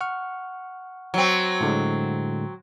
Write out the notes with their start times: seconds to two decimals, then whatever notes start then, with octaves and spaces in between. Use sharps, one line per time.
0.01 F#5 C#6 F6
1.14 F#3 C4
1.61 A2 D3 G#3